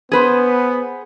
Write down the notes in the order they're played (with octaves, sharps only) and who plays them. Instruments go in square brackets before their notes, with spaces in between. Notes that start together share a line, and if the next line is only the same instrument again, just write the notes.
[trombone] B3 [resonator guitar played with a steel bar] G#4 B4 C5